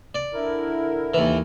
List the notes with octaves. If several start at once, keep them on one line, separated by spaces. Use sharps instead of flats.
D5
D3 E4 A#4
D#2 E3